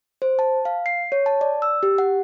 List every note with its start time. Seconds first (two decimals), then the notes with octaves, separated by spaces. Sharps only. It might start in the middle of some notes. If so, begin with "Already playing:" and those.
0.22 C5
0.39 A5
0.65 F5
0.86 C7
1.12 C#5
1.26 A5
1.41 D5
1.62 E6
1.83 G4
1.98 F#5